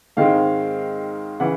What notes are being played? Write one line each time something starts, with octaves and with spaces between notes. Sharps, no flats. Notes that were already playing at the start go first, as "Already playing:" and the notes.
G#2 D#3 G#3 C4 F5
C#3 E3 F#5